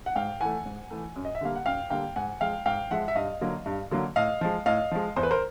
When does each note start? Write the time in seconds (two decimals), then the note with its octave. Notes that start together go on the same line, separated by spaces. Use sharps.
0.06 F#5
0.16 G#2 F5 G5
0.40 E3 A3 F#5 G#5
0.66 G#2
0.91 E3 A3
1.16 F#2
1.25 D#5
1.35 E5
1.41 D3 G3 A#3 F5
1.55 F#5
1.66 F#2 F5 G5
1.90 D3 G3 A#3 F5 G5
2.16 G#2 F#5 G#5
2.41 F3 G#3 F5 G5
2.66 G#2 F5 G5
2.91 F3 G#3 E5 F#5
3.08 E5
3.15 G2 D#5 F5
3.41 D3 F#3 A#3
3.66 G2
3.91 D3 F#3 A#3
4.16 A2 D#5 F5
4.41 F3 G#3
4.66 A2 D#5 F5
4.91 F3 G#3
5.16 E2 C5
5.23 B4
5.31 A#4 C5